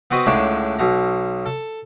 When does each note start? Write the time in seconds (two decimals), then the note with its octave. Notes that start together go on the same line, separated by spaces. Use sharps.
0.11 B3 C4 F#4 B4 D#5
0.26 C#2 A2 D3 G#3 D4 C#5
0.79 B1 B2 A#5
1.46 A4